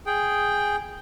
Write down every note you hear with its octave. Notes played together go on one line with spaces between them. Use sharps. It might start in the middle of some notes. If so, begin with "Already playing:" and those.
G#4 G5